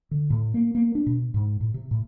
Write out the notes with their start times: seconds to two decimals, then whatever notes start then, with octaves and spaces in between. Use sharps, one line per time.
0.11 D3
0.30 A2
0.54 A#3
0.75 A#3
0.95 D4
1.07 B2
1.34 G#2
1.61 A2
1.74 C3
1.91 A2